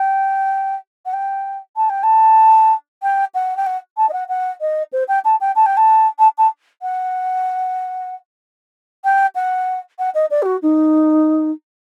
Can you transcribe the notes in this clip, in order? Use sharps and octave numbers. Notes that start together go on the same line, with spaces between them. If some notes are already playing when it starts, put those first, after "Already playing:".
Already playing: G5
F#5
G5
A5
G5
A5
G5
F#5
G5
F#5
A5
D#5
F#5
F#5
D#5
C5
G5
A5
G5
A5
G5
A5
A5
A5
F#5
G5
F#5
F#5
D#5
D5
G4
F#4
D#4